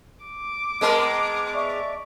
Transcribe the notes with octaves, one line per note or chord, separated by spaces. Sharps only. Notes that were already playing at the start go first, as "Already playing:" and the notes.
D6
G#3 B3 A#4 D#5 A5
D5 E5 C#6